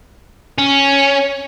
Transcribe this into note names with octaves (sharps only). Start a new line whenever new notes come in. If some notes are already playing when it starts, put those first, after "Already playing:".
C#4